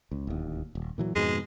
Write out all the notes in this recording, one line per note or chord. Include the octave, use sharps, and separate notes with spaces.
C#2
D1 D#2
D#1
A#2 E3 F#3
F2 G#2 B2 G#3